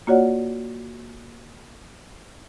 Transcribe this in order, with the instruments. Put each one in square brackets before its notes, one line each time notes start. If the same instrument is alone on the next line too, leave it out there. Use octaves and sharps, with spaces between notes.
[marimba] A#3 F4 F#4 C#5 D5 F#5